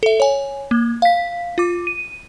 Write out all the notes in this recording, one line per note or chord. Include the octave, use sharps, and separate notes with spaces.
A4 E5
C#5 G#5
A#3
F5 B6
F4 D6
D#7